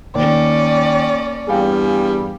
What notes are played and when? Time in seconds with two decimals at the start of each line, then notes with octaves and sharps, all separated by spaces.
0.15 D#2 A#3 C#4 D5
1.47 E2 G2 G3 G#4 F5 G5